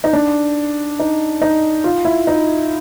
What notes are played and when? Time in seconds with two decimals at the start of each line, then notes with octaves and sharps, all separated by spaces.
0.04 D#4
0.13 D4
0.99 D#4
1.42 D#4
1.84 F4
2.05 E4
2.27 D#4